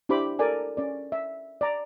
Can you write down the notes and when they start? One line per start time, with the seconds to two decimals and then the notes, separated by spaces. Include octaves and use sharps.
0.09 D4 E4 G4 C5 B5 D6
0.39 A4 A#4 D5 G#5
0.77 C#4 D5
1.12 E5
1.61 D5 A#5